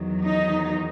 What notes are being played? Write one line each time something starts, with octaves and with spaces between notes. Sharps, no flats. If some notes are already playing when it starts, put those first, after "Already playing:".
Already playing: E2 D#3 F#3
D#4